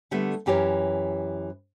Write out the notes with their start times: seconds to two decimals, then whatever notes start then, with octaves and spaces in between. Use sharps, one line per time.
0.11 D3 G3 A3 B3
0.46 F#2 E3 G4 A#4 C#5